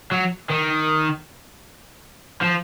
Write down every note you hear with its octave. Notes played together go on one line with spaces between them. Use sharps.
F#3
D#3
F3